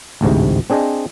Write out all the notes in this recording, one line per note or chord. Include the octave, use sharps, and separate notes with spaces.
A1 D2 G#2 C3
C4 D4 G#4 C5 D#5